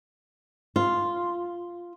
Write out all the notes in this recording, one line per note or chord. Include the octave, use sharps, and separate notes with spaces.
F4